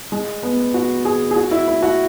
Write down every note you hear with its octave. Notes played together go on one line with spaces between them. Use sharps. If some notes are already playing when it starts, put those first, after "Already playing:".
G#3
B3
F#4
G#4
G#4
F#4
E4
E4
F#4